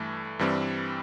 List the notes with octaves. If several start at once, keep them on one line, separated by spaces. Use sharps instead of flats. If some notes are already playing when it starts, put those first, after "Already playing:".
Already playing: G2 E3 A3
G2 E3 G3 C4